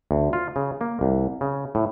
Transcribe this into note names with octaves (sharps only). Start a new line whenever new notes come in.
D2
F4
C#3
A#3
C2
C#3
A2